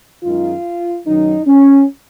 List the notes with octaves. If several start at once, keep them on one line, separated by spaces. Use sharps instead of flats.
F#2 D#3 G#3 F4
F#2 D#3 F#3 D#4
C#4